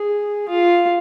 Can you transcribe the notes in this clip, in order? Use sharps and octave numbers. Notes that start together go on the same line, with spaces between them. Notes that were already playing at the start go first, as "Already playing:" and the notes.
Already playing: G#4
F4